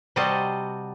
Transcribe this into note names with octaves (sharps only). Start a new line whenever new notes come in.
C3 G3 F#4 C5 D#5 A5